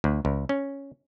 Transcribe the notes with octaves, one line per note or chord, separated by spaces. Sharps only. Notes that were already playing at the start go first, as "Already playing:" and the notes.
D2
C#2
C#4